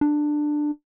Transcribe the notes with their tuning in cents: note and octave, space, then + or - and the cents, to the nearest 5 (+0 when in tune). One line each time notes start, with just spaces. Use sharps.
D4 +15